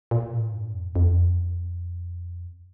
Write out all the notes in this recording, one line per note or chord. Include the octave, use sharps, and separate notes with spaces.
A#2
A2
G2
F2
F2